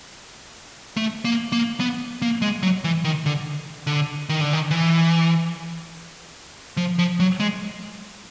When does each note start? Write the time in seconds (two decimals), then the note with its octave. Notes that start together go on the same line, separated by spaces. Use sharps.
0.97 A3
1.25 A#3
1.52 A#3
1.80 B3
2.22 A#3
2.42 G#3
2.63 F#3
2.84 E3
3.05 D#3
3.26 D3
3.87 D3
4.29 D#3
4.41 D3
4.53 D#3
4.71 E3
6.77 F3
6.99 F3
7.20 F#3
7.40 G#3